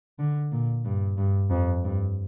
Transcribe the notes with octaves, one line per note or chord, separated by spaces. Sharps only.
D3
A#2
G2
G2
F2
G2